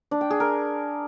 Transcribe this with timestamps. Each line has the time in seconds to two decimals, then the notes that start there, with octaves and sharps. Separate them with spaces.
0.11 D4
0.21 G5
0.30 G#4
0.40 A#4